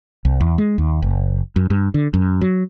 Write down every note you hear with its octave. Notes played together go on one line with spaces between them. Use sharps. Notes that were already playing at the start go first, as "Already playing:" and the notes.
C2
E2
G#3
D#2
F#1
F#2
G2
D3
F#2
F#3